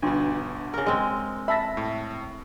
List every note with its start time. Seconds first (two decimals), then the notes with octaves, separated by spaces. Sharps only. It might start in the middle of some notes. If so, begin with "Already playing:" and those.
0.02 G1 B2 D4 F4 C6
0.74 C#3 A#4
0.86 G#3 C4
1.48 E5 A5 B5 A#6
1.77 A2